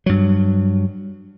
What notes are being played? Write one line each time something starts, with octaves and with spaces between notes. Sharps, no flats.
G2 F#3